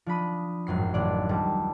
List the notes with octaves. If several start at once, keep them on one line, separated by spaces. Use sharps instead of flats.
F3 D4 B5 D#6
G#1 F#2 A2 C7
A1 D#3 D4 D5
D#1 G3 A5 D6